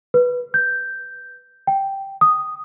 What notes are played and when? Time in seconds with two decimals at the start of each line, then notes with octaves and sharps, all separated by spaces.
0.14 B4
0.54 G6
1.67 G5
2.21 D#6